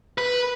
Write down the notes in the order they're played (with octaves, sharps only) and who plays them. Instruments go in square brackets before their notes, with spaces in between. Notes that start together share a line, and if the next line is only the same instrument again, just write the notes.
[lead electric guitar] B4